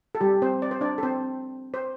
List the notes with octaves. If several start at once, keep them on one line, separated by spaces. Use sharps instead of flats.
A4
G3 G4
C4 C5
D5
C5
D4 D5
A4
C4 C5
C5